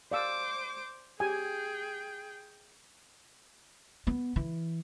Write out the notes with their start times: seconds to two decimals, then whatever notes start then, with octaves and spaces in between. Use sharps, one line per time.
0.12 C5 D5 F5 D6 E6
1.20 G4 G#4 G5 G#5
4.07 B3
4.36 E3